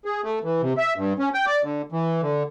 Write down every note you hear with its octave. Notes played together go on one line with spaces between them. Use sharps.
G#4
A3
E3
C3
E5
G2
C#4
G5
D5
D3
E3
D3